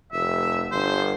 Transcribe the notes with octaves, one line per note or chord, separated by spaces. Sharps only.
F1 E5
G1 C5